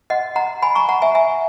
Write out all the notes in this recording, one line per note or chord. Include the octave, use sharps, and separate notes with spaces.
D#5 F#5
F#5 A#5
G#5 B5
A#5 C#6
F#5 A#5
E5 G#5
E5 G#5